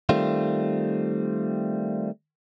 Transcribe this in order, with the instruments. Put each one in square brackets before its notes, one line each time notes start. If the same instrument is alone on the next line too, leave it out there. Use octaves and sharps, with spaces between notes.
[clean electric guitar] D#3 G3 A3 C4 F4